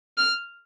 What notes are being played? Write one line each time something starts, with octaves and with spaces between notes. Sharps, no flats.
F6